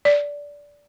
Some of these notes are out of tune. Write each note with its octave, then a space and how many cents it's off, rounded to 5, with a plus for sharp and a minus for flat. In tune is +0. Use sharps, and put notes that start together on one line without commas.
D5 -15